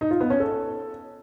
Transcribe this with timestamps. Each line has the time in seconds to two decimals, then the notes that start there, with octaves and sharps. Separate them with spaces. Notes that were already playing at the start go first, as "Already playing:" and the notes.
0.01 D#4
0.11 F4
0.21 B3
0.30 C#4
0.40 A4